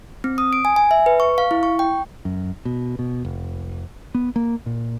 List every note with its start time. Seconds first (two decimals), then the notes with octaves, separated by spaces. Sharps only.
0.24 C4
0.38 D#6
0.53 D7
0.65 G#5
0.76 G#5
0.91 E5
1.06 B4
1.20 C#6
1.38 F5
1.51 E4
1.63 C#6
1.79 G5
2.25 F#2
2.65 B2
2.99 B2
3.25 F1
4.15 B3
4.36 A#3
4.66 A#2